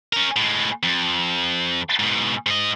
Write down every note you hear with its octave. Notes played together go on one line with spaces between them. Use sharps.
C#4 A#4
A2 G#3
F2
G#2 B2
G#2 D#5